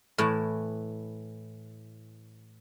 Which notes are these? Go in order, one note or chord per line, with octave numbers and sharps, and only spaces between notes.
A2 E3